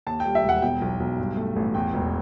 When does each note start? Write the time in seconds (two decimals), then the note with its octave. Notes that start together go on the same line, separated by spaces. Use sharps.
0.06 D#2 A5
0.20 G5
0.25 G3
0.35 E5
0.43 E1
0.49 F#5
0.62 B2 G5
0.81 B1
1.00 B1
1.18 G2
1.37 A3
1.56 A1
1.74 E2 G5
1.94 E1